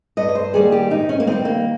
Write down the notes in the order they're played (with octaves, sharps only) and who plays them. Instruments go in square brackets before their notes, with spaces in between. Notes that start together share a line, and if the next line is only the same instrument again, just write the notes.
[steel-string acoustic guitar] G2 D#5
C#5
C5
D#3 G3 A#3 G#4
G4
G#2 D#4
C#4
A#3
D#3 G3 C4
A#3